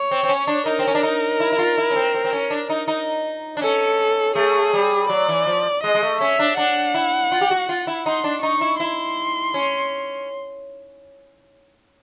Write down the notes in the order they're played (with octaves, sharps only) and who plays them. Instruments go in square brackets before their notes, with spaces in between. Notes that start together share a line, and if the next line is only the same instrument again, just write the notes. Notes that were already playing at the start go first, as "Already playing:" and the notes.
Already playing: [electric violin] C#5
[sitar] C4
C4
C#4
D4
[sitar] D#4 [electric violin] A#4
[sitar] C4
C#4
D4
D#4
E4
E4
F4
E4
C#4
C4
C4
C4
C#4
D4
D#4
D#4
D4
[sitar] C#4 [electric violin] A4
[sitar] A3 [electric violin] G#4
[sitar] G3
[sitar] F#3 [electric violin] D5
[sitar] E3
F3
[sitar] G#3 [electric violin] D#5
[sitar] G#3
A3
[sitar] C#4 [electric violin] E5
[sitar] D4
[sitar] D4 [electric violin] F#5
[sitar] E4
F4
G4
F#4
F4
E4
[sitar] D#4 [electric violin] C6
[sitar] D4
[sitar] D#4 [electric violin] C#6
[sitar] E4
[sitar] E4 [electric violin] C6
[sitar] C#4